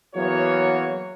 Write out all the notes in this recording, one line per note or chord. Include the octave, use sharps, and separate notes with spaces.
E2 F#3 A#3 F#4 C#5